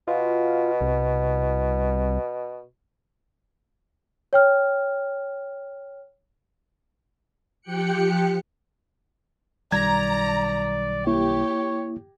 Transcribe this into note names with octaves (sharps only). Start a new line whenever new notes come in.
B2 F4
C2
C#5 G5 F6
F3 G4 G5 F#6 C#7
B1 D#3 G3 D5 A#5 G#6
A#3 E4 G4 C#5